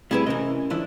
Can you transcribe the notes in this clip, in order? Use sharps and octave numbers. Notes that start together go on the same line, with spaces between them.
G3 A3 C4 E4 G#4 B4
C3 E3 C#4 A#4 D#5
D#3 F3 D4 E4